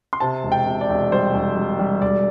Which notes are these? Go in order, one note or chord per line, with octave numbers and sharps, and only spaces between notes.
C6
C3 A5
E1
G5
C3
D5
E1
G3 C5
E1
G3
G3
E1 D5